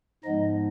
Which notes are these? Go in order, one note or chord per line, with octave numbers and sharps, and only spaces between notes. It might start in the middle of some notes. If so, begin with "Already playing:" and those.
G#2 F3 G#3 B3 D#4 D#5